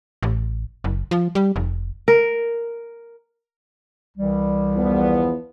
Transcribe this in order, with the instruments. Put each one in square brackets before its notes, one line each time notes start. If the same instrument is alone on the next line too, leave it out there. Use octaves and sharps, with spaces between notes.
[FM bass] A1
F#1
F3
G3
F1
[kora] A#4
[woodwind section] C2 E3 G3
[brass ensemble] E2 F3 B3